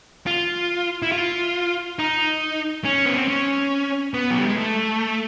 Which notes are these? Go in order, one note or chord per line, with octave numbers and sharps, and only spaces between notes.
F4
E4
F4
D#4
C#4
B3
C4
C#4
B3
F#3
G3
G#3
A3